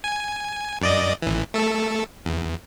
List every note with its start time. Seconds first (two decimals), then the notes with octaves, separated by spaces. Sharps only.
0.04 G#5
0.81 F#2 D5 D#5
1.22 A1 E3
1.54 A3 A4
2.25 E2